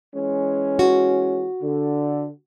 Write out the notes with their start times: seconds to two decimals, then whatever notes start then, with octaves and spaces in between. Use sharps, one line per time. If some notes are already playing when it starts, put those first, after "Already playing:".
0.15 E3 G#3 C#4
0.79 F#4
1.62 D3